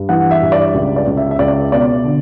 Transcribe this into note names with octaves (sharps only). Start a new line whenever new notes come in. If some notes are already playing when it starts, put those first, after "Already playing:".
Already playing: G2
E3 F#5
E5
G2
D5
C#2
D5
C#2
E5
E5
C#2 D5
B2 D5
D3